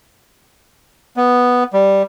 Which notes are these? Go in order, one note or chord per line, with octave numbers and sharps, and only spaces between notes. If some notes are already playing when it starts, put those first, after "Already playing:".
B3
G3